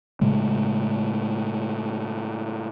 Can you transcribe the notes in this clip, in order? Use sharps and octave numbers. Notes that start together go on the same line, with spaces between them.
A2 C#3 G#3 A3